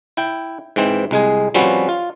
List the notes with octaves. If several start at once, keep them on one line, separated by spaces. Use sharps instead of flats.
E4 G5
G#2 E3 C4
C2 G#3 G#4
F3 G3 C4 C#4 F#4 B4
F4